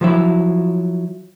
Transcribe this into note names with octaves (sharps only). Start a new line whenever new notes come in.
F3 F#3 E4